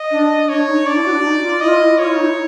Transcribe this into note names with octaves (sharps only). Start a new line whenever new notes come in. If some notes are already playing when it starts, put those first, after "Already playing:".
Already playing: D#5
D4
D4 C#5
D#4
D4 D5
E4
F#4
D4
D#4
F4
E4 D#5
F4
E4
F4 C#5
E4
D#4
E4